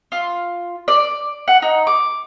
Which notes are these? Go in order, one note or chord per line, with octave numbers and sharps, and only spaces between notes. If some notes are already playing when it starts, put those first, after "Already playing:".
F4
D5
F#5
D#4
D6